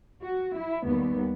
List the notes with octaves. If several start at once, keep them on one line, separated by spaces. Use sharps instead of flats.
F#4
E4
D#2 G3 B3